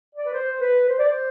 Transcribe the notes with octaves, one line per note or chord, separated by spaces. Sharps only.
D5
B4
C5
B4
C5
D5
C5